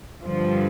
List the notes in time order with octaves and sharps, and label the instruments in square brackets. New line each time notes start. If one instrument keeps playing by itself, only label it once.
[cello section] G2 D3 F3